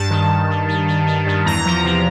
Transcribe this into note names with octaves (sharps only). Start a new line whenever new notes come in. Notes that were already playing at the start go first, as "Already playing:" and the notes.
Already playing: G2 A5
D#3
G2
D#3
D#3
D#3
D#3
G2
E2 A#5
F3
C3